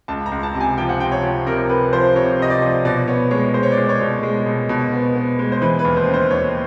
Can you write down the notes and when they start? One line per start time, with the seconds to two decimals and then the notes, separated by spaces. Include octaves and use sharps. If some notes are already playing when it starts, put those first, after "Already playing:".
0.08 C#2 A5
0.26 A#5
0.32 C#2
0.43 A5
0.54 C3
0.60 G#5
0.78 F3 G5
0.89 F#5
1.00 C3 G5
1.12 C#5
1.23 F3
1.46 C3 A#4
1.69 C3 B4
1.93 F3 C5
2.16 C3 C#5
2.39 C3 D#5
2.50 D5
2.62 F3
2.85 B2 D5
3.08 B3 C#5
3.31 G#3 C#5
3.54 G#3 C5
3.63 C#5
3.72 D5
3.77 G#3
3.84 D5
3.89 C#5
4.01 B2
4.23 G#3
4.46 B2
4.69 B2
4.93 B3
5.15 B3
5.39 G#3
5.52 C5
5.62 E3 B4
5.79 B4
5.85 D#2
5.97 C5
6.08 C#3
6.14 C5
6.31 D#2 C#5